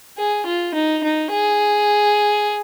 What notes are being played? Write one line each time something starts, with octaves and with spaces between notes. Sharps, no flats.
G#4
F4
D#4
D#4
G#4